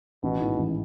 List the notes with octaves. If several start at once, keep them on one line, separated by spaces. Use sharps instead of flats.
A1 B2
G#2 E3
A1